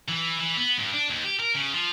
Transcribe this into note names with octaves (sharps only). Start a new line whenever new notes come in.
E3
E3
B3
G2
D4
D#2
G4
A#4
C#3
F3